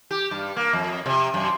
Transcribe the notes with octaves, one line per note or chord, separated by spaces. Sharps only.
G4
G2
A#3
F2
C3
F#2